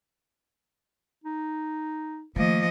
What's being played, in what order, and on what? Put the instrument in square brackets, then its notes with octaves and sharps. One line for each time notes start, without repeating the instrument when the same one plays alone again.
[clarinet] D#4
[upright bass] D#3 A3 [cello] F3 D#5 [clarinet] A#3